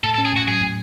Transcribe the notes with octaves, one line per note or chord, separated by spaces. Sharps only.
A2 A4
A4
C#4
G#4
A2 F#4
F#3 G#4
A2